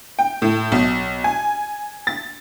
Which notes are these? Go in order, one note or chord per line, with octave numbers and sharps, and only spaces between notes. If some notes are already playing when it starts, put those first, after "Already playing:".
G5
A2
B1
G#5
A6